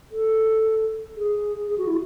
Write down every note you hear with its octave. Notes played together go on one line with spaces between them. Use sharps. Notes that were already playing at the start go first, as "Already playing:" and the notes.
A4
G#4
G#4
F#4
E4